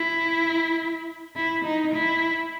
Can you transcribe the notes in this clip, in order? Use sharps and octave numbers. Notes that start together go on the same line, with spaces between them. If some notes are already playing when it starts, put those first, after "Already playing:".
Already playing: E4
E4
D#4
E4